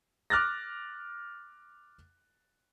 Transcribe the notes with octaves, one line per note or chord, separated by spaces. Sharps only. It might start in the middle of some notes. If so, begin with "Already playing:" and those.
D6 F6 F#6 A6 A#6